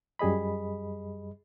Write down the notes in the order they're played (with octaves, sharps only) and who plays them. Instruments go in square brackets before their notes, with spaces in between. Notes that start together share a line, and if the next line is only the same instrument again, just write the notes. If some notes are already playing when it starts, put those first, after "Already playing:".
[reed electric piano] F#2 G3 G#4 D#5 B5